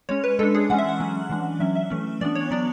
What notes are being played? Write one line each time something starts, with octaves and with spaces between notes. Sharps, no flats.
G#3 C#4 C#5
B4
G#3 D4 A4
G#4
E3 G#3 C#4 F#5
E5
F#5
F#3 C#4
E3 G#3 D4
F#3 C#4 E5
E5
E3 A3 C#4
E3 B3 D4 D5
C#5
F#3 B3 D4 D5